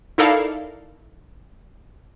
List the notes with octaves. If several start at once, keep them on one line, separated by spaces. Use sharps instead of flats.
D#4 E4 A4 A#4 D5 F5